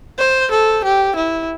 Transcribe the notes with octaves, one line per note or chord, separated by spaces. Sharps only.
C5
A4
G4
E4